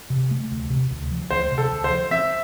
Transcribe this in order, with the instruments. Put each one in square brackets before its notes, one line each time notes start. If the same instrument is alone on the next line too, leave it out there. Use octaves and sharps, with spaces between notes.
[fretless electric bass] C3
A3
D2
C3
D2
F3
[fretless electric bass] D2 [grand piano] C5
[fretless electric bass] C3
[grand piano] A4
[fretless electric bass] D2
[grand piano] C5
[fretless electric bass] F3
[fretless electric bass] C4 [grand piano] E5